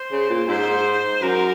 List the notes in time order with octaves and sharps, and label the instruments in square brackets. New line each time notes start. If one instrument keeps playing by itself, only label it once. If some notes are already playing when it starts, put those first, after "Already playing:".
Already playing: [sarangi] C5
[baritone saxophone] C#3
A#2
[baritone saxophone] G#2 [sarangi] C5
[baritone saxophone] F#2 [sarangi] A#4